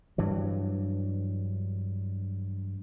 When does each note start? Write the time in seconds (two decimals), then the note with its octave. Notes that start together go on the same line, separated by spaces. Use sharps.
0.18 G2 E3 F#3